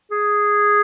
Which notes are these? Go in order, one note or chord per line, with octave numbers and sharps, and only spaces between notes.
G#4